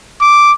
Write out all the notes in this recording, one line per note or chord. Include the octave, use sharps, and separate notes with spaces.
D6